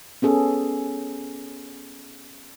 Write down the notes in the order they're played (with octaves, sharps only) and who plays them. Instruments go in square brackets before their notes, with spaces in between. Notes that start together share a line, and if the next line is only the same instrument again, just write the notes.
[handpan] B3 C#4 G#4 A4